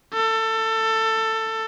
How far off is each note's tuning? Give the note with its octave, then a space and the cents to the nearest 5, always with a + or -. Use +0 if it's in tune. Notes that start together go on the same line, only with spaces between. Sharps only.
A4 +20